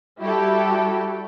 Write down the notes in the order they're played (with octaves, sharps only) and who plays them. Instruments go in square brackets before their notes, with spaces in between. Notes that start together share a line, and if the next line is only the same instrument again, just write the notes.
[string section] G3 E4 F#4 G4 A4